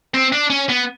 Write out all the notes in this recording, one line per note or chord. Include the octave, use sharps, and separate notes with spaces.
C4
D4
C#4
B3